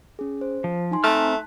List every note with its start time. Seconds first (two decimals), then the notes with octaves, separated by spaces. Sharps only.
0.19 C#4 G#4
0.41 C5
0.64 F3
0.91 D#4 G#5 C6
1.04 A3 C4 A5 A#5 F6 F#6 B6